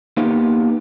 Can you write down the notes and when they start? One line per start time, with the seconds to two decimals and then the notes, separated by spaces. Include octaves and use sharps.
0.17 A#3 B3 D#4 F4 G4 B4